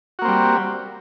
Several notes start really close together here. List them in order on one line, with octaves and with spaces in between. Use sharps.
F#4 A#3 C4 G3